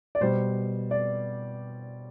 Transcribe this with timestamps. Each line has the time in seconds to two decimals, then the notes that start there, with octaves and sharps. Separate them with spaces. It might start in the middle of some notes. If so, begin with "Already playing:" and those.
0.15 D5
0.21 B2 G3 C5
0.91 D5